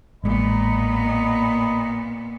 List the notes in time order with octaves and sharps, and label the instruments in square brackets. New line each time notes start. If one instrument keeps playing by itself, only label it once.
[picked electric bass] A1 G#3 [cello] A#2 B3 [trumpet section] D#5 A#5 B5